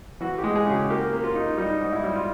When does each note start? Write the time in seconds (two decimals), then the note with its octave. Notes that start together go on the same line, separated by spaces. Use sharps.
0.21 E3 F#4
0.38 G4
0.44 G#3
0.55 G#4
0.67 C#3
0.72 G4
0.90 A#3 G4
1.13 A#3
1.24 F4
1.35 D#4
1.58 G3 D#4
1.81 G#2
1.92 E4
2.04 G3
2.15 F4